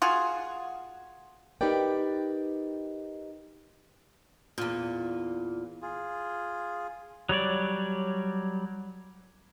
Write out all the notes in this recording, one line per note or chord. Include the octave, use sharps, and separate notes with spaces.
F4 F#4 G#4
D#4 G4 A#4 B4 D5 G5
E2 A#2
F4 G#4
F#3 G3 C#5 D5